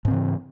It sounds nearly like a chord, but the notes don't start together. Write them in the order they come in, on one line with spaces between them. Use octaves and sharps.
G#2 C4 C#3 E3